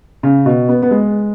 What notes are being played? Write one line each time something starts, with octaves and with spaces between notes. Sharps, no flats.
C#3
B2
B3
B3
G#3